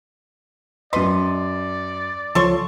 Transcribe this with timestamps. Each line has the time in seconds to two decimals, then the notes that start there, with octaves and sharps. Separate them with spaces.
0.93 F#2 B4 D5 D#5 C6
2.35 C#2 F3 A4 C#5 C6 C#6